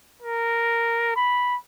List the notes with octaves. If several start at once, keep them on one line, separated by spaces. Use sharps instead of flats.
A#4
B5